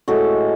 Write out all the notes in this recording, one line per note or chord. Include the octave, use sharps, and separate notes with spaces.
A2 G#3 F#4 A4